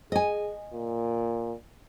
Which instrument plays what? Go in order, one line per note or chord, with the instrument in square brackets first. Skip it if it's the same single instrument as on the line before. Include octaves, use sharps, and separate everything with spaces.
[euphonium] G#4 [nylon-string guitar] D#5 G#5
[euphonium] A#2